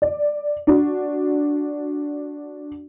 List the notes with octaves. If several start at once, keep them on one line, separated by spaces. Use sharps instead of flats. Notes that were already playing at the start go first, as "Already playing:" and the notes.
D5
D4 F#4